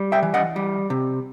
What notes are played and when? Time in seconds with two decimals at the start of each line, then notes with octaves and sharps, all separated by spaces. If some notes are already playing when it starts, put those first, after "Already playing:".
Already playing: G3
0.12 E5 G5
0.23 E3
0.34 D#5 F#5
0.56 G3
0.90 C3